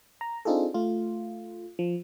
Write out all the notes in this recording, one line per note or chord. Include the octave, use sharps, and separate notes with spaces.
A#5
C4 D4 D#4 F4 G#4 A4
A3 F4
F3